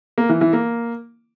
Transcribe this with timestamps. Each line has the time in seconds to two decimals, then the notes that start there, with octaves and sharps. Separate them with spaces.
0.18 A#3
0.29 E3
0.41 E3
0.53 A#3